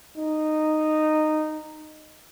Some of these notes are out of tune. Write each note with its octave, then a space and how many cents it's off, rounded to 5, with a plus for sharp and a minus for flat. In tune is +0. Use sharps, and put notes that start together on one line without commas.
D#4 -10